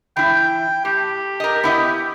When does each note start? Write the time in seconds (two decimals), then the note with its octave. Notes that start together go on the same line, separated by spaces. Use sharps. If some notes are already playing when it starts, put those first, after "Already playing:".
0.17 E3 E4 G5
0.85 A2 G4
1.40 A#4 D#5
1.64 B3 E4 D#5